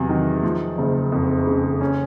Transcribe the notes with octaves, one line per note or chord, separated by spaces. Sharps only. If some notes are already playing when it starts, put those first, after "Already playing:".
Already playing: E2 C3 F#3
D#3
F3
F#1
F2
C#3
C#4